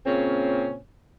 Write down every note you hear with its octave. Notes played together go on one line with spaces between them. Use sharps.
A#2 C#3 C4 C#4